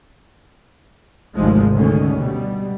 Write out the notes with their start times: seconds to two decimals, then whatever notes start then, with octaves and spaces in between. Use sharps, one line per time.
1.34 G#1 D2 C3 F3 G#3
1.73 D2 G#2 D3 D#3 G#3 C#4
2.16 B2 G3